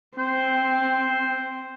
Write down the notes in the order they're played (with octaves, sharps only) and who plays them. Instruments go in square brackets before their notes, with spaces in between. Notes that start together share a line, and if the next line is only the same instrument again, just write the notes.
[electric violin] C4 [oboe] C5